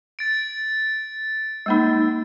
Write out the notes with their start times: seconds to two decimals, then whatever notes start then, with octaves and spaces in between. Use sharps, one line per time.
0.19 A6 D7
1.66 G#3 A#3 D#4